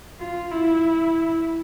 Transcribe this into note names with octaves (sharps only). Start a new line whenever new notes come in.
F4
E4